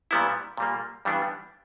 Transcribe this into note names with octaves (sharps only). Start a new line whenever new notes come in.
A#2 G3 B3 E4
A#2 G3 A#3
G2 E3 G3 B3 D4